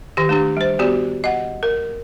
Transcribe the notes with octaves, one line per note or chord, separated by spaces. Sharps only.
D#3 G4
A3 D4 G4
G3 C5
B3 F#4 G4 D5
D#5 F#5
A#4